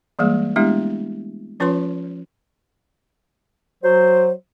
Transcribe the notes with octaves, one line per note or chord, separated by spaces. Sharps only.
E3 G3 G#3 A#3 G#4
G#3 A3 B3 D4 E4 G4
F3 C#4 F4 B4 C#5 C6
F#3 C5